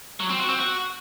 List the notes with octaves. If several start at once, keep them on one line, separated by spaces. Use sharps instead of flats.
F#3
C4
F#4
C4
F#4